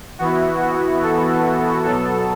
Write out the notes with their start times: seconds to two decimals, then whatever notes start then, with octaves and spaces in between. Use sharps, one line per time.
0.19 E3 B3 E4 F#4
0.62 F#4
1.02 A4
1.85 B2 F#3 B3 A4